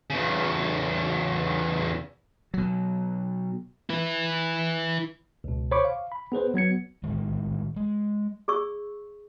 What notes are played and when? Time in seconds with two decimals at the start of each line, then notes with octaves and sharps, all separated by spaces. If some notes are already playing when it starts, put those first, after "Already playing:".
0.10 E2 C#3
2.54 B2 F#3
3.90 E4 B4
5.44 C#2 B2
5.71 C5 C#5 B5 C#6 D6
5.85 F5
6.12 B5
6.32 B3 G#4 B4 C5
6.54 F#3 B3 G#6 C#7
7.04 A2 D#3 G#3
7.76 G#3
8.48 G#4 D5 C#6 E6